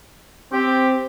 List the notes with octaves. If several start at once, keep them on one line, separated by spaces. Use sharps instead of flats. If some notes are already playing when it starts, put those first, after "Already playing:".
C4 G4